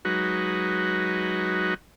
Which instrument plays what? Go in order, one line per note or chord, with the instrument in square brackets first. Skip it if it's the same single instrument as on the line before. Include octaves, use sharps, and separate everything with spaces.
[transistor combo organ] F#3 G#3 D#4 F#4 B4